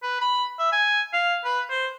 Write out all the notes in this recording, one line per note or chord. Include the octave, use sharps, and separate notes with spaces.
B4
B5
E5
G#5
F5
B4
C5